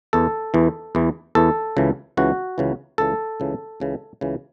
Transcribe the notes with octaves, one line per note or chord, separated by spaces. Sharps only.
E2 E3 A4
E2 E3
E2 E3
E2 E3 A4
C#2 C#3 E3
C#2 C#3 E3 F#4
C#2 C#3 E3
C#2 C#3 E3 A4
C#2 C#3 E3
C#2 C#3 E3
C#2 C#3 E3